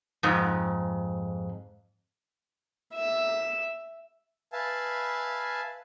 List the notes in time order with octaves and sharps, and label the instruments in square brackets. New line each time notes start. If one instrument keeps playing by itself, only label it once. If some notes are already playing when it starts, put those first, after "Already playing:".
[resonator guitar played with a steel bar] F2 G#2
[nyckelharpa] E5
[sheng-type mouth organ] B4 E5 F5 G#5 A5